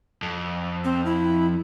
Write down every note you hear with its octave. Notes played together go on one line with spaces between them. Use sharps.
F2
C4
E4